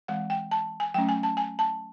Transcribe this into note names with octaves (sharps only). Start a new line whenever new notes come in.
E3 G#3 C4 F#5
G5
A5
G#5
F#3 A3 C#4 G5
G#5
A5
G#5
A5